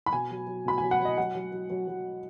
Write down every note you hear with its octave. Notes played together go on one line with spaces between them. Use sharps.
B5
B2 G#5
F#3
F#3
B2 B5
F#3 G#5
F#5
F#3 D#5
F#3 F#5
F#3
F#3
F#3
F#3